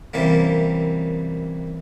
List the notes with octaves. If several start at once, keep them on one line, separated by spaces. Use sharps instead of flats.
F#2 C3 E3 G3 A#3